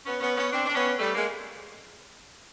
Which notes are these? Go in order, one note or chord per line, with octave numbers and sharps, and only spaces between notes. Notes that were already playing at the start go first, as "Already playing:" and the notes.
B3 C#4
B3 C#4
B3 C#4
C4 D4
D4
B3 C#4
G3 A3
G#3 A#3